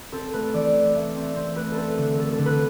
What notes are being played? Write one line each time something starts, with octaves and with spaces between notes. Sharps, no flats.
C4 A4
A3 B4
E3 D5
C4
A3 E5
C4
C4 C5
A3 B4
A4
C4 B4
D3
A3 A4
A4
D3
B4